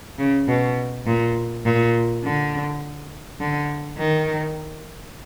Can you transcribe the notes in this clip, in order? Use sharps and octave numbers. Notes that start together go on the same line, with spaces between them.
C#3
B2
A#2
A#2
D3
D3
D#3